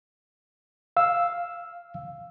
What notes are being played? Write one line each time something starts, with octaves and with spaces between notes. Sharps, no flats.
F5 E6